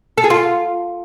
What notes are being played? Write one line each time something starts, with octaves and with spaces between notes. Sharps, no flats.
A4
G#4
F4